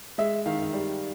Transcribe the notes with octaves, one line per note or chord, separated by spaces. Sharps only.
G#3 E5
D#3 F5
G3